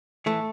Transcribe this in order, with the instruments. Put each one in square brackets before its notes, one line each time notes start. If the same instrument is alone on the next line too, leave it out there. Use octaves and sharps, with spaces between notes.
[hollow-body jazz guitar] A2 E3 A3